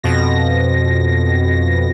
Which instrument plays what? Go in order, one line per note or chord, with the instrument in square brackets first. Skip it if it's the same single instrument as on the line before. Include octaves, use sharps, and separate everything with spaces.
[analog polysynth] F2 B2 A#6